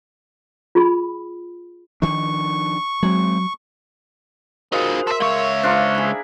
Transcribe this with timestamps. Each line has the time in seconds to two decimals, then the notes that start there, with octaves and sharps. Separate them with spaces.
0.75 F4 G#4 B5
2.02 D#3 F3 D4 C#6
3.03 F#3 G#3 C4
4.72 D#4 F4 F#4 G#4 A#4 C5
5.07 A4 A#4 E5 C6
5.20 C#2 C#5 E5 F5
5.63 D4 F4 A#4 C5
5.95 E4 G#4